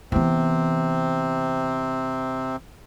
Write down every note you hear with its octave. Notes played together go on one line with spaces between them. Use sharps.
C3 E3 B3 C4